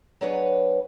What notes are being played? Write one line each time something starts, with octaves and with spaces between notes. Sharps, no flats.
F#3 B3 D4 G#4 B4 C#5